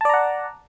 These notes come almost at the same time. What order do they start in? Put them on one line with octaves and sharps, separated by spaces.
A5 D5 A#5 F#5